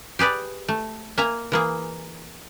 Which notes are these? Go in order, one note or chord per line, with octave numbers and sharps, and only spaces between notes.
G4 G#4 B4 D5
A3
A#3 E5 G#5 A#5
E3 A#3 G#4